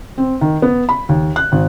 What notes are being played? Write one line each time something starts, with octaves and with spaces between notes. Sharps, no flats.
C4
D#3
B3
B5
D#2
F#6
G#1